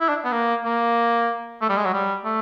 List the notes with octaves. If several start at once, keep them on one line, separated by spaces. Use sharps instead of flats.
E4
D4
B3
A#3
A#3
A3
G3
G#3
F#3
G3
A3